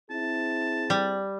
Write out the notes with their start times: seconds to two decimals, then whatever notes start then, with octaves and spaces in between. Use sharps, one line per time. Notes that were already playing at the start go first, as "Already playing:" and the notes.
0.10 C4 E4 G#4 A5
0.90 G3